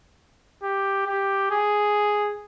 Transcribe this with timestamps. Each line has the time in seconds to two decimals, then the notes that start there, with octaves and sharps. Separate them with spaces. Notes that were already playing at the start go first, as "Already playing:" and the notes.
0.63 G4
1.07 G4
1.51 G#4